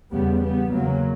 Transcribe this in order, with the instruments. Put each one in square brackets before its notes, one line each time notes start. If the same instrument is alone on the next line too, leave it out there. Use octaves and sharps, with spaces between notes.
[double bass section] E2 C#3 G3 B3
G3 B3
E2 C#3 F#3 A#3